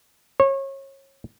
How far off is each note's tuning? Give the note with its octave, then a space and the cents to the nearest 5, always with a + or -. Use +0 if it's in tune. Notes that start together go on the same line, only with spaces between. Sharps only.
C#5 -30